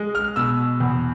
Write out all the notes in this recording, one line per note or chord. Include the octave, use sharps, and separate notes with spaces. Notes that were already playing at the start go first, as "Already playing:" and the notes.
Already playing: G#3
F6
B2 E6
E2